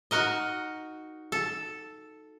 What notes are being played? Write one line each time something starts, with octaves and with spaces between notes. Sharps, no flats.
D#4 F#4 A#4 D#5
A4